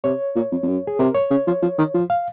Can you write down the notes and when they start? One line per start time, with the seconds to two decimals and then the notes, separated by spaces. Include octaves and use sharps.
0.04 C3 C#5
0.36 A#2
0.51 F2
0.63 F2
0.67 F#2
0.87 G#4
0.99 C3 A#4
1.15 C#5
1.31 C#3
1.47 F3
1.62 F3
1.78 D#3
1.94 F3
2.10 F5